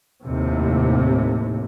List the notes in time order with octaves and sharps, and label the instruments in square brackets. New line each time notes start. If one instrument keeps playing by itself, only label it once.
[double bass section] F1 D#2 A2 C3